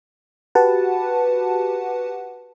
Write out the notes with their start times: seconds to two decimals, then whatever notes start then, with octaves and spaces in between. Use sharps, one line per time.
0.55 F#4 G4 B4 F#5 A5